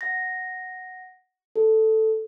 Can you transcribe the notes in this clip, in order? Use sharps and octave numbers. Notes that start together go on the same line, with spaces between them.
F#5 A#6
A4